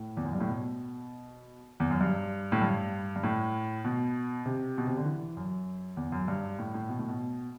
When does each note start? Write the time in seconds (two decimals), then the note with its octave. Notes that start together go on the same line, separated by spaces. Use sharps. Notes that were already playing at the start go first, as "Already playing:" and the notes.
Already playing: A2
0.17 E2
0.25 F#2
0.33 G2
0.40 A2
0.48 B2
1.80 E2
1.90 F#2
2.01 G2
2.52 A2
2.62 G2
3.16 G2
3.23 A2
3.84 B2
4.46 C3
4.78 B2
4.87 C3
4.97 D3
5.05 E3
5.37 F#2
5.97 E2
6.12 F#2
6.28 G2
6.59 A2
6.74 A2
6.89 B2
6.99 A2
7.08 B2